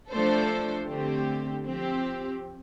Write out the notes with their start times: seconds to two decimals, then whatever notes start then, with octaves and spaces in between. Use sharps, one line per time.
0.10 F3 A3 D4 A4 C5
0.87 D3 A3 C4 G4
1.64 F3 C4 G4